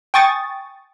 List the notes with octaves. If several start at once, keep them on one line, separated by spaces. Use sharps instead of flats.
G5 G#5 C#6 D#6 A6